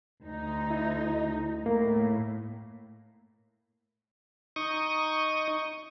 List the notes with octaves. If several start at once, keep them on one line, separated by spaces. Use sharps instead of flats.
D2 D#4
E4
A2 A#3
D#4 C#6 D#6